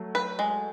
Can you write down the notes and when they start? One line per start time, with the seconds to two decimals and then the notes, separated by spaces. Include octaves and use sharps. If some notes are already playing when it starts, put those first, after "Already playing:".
Already playing: F#3 A3
0.15 B4
0.39 G#3